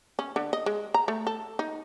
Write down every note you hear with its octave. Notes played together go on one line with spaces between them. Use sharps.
C#4
D3
D#5
G#3
A#5
A3
A4
D#4